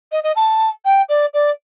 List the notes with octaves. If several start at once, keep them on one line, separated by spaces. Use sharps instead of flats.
D#5
D#5
A5
G5
D5
D5